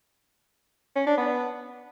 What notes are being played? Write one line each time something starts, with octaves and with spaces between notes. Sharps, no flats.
C#4
D4
B3